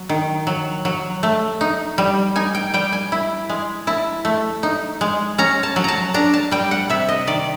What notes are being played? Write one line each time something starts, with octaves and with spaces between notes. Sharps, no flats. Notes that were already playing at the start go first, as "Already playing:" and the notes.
Already playing: F#3
D#3
F#3
F#3
A3
D#4
G3
D#4 G#5
G5
G3 G5
G#5
E4
G#3
E4 A5
A3
D#4
G#3
C#4 A#5
A5
F#3
A5 A#5
D4 A#5
A5
G3 G5
F#5
C3 E5
D#5
D#3 D5